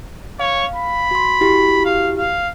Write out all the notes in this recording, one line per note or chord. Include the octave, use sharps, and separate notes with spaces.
C#5 F5
B5
F#4 C6
E4 F#4 G4
F5
F5